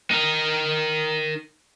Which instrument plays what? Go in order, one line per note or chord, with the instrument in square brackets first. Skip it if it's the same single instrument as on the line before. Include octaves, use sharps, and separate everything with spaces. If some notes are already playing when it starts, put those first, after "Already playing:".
[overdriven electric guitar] D#4 A#4